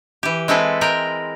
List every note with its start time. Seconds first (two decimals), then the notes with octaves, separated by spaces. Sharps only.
0.23 E3 G4
0.48 G#3 C4 E4 A4 B4
0.81 G#3 A#4 G5